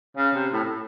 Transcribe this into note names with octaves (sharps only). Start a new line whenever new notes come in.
C#3
C3
A2
A2